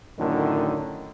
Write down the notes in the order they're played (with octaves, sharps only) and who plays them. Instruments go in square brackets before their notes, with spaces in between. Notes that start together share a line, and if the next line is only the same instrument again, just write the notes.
[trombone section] F#2 A2 D3 D#3